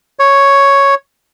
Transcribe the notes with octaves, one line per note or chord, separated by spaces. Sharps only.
C#5